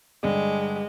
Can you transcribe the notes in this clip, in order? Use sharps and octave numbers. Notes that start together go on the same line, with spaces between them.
G2 D3 G#3